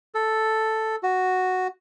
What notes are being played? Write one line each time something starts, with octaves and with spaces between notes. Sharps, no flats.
A4
F#4